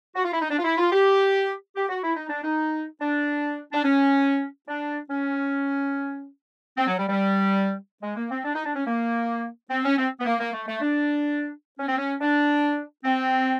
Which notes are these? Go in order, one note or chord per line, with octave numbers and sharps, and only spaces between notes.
F#4
F4
E4
D#4
D4
F4
E4
F4
G4
G4
F#4
E4
D#4
D4
D#4
D4
D4
C#4
D4
C#4
C4
F#3
G3
G3
G#3
A#3
C4
D4
D#4
D4
C#4
A#3
C4
C#4
C4
B3
A#3
A#3
A3
A3
D4
C#4
C4
C#4
D4
C4